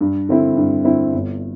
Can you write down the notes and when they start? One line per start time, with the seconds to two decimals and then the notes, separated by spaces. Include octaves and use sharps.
0.01 G2
0.29 D3 C4 E4
0.57 G2
0.85 D3 C4 E4
1.14 G1